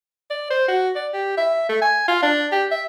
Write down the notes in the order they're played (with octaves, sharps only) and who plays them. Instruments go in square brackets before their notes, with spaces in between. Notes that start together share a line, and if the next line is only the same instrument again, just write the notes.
[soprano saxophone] D5
C5
F#4
D5
G4
E5
A3
G#5
F4
D4
G4
E5